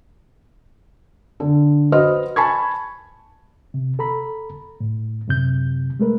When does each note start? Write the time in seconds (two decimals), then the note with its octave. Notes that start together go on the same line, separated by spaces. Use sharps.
1.40 D3
1.92 F#4 B4 C5 D#5 F6
2.36 G#5 A5 B5 C#6 G#6
3.74 C3
3.99 A4 A#5 B5
4.80 A2
5.28 F#2 C3 G6
5.99 G#3 A3 A#4 B4